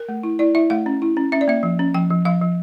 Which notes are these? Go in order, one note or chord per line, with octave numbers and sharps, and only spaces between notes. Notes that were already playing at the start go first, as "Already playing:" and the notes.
Already playing: A#4
A3
E4
E4 D5
E4 E5
A3 F5
C#4
E4
C#4
C#4 E5
D5
A#3 E5
F3
C#4
F3 G5
F3
F3 F5
F3